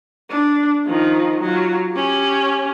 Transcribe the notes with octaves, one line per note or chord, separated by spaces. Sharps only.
D4
D#3 F3
F#3 F4
C#4 G4